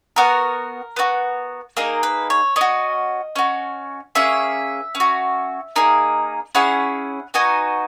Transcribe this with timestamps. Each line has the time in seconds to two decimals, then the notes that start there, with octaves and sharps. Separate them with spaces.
0.16 B3 F#4 A#4
0.96 B3 D#4 F#4
1.77 A#3 D#4 G#4 A#4
2.03 B4
2.30 C#5
2.56 C#4 F#4 D#5
3.36 C#4 F#4
4.15 A#3 C#4 G#4 E5
4.95 C#4
5.00 F#4
5.76 A#3 D#4 G#4
6.55 C#4 E4 G#4 F#5
7.34 B3 D#4 F#4 G#5